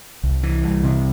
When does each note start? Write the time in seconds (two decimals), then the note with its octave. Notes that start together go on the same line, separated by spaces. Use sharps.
0.24 C2
0.43 E3
0.63 C2
0.84 C3